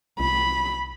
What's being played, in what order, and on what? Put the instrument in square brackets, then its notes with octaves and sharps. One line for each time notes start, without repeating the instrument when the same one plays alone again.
[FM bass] C2 [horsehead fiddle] B5